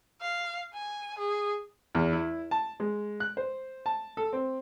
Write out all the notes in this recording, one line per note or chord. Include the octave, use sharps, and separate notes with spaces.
F5
G#5
G#4
E2
E4
A5
G#3
F#6
C5
A5
A4
C4